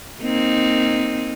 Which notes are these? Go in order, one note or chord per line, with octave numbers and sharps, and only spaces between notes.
A#3 C4 D#4